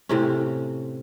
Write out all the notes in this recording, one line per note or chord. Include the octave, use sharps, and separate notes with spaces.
A2 C3 C#4